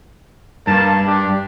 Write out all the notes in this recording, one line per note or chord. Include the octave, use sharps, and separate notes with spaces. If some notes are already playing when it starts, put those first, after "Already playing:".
G2 A#3 A5
D4 G4